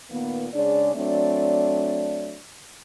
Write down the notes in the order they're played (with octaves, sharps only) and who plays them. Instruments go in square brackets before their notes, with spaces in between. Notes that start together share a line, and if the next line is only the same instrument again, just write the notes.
[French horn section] A#2 D#3 A#3 B3
C#3 G#3 D4 D5
F#3 A3 C4 D4 D5